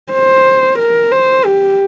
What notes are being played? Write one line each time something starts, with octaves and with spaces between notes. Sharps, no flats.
C5
A#4
C5
G4